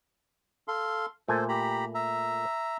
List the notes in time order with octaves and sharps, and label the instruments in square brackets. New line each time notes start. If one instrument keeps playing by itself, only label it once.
[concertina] A4 F5 C6
[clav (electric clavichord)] A#2 A3 G#5 [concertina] A4 C5
[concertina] G4 A#5 B5
E5 A#5